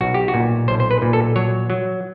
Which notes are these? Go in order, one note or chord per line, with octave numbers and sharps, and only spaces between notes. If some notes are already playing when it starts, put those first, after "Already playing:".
B1 F#4
G4
F#4
A#2
B1 C5
C5
B4
A#2
A4
F#3 C#5
F#3